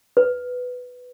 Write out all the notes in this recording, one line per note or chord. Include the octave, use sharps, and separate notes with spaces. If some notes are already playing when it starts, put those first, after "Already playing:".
B4